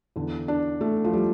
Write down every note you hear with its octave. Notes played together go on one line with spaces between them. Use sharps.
E2 D3
D4
A3
F3
G3